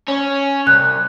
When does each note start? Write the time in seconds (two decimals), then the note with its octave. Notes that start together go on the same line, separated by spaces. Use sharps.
0.08 C#4
0.67 C2 F#6